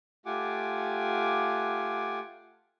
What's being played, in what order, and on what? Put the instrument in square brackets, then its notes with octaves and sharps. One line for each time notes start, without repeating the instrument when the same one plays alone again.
[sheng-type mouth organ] A3 F4 G4 F#5 G#5 D6